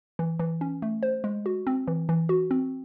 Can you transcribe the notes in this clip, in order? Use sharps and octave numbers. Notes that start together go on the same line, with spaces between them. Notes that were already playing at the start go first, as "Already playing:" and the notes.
E3
E3
C#4
A3
C5
G#3
F#4
C4
E3
E3
F#4
C4